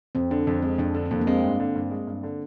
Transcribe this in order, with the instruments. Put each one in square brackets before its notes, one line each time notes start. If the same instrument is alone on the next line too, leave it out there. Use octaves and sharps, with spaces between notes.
[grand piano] F2 [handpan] C4
[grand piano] D3 [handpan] D4
[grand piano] F2 [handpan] C4
[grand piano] G#3 [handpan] C4
[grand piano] F2 [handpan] D4
[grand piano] D3 [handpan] D4
[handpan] C4
[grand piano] F2 [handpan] A#3
[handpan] A#3
[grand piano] G#3 [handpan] C4
[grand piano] G2
D3
G2
G#3
G2
D3